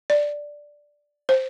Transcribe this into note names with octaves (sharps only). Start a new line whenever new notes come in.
D5
C5